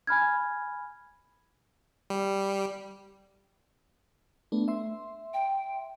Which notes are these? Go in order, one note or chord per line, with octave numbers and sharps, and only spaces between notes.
G#5 B5 F6 G#6
G3
A3 B3 D4
E5 C6
G5